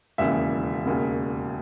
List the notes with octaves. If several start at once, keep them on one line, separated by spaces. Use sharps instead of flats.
E1 D#2 C#3 E3 E5
E1 D#2 C#3